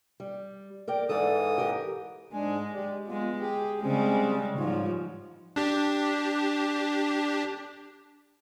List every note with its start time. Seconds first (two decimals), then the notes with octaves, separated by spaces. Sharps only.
0.20 G3
0.88 A#4 D5 G5
1.09 G#2 E3 A4 D5 D#6
1.58 G4 A#4
2.33 G#2 G#3 D4 G#5
2.74 G4 D5
3.07 G#3 B3 F4
3.41 G4 G#4
3.82 C#3 G3 G#3 C4 C#4 G#4
4.58 G#2 F3 G3 F4 C#5
5.56 D4 G4